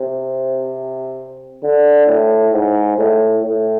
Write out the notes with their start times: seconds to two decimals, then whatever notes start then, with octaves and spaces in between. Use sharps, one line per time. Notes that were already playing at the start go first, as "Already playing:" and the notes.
Already playing: C3
1.63 D3
2.07 A2
2.53 G#2
2.98 A2
3.43 A2